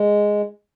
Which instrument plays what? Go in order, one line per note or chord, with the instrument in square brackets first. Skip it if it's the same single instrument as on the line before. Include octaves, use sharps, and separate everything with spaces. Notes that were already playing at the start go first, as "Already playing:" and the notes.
Already playing: [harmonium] G#3